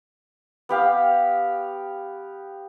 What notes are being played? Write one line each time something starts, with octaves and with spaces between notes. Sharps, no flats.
B3 G4 F5